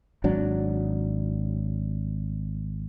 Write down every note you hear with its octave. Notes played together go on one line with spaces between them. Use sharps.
G#1 F#3 D4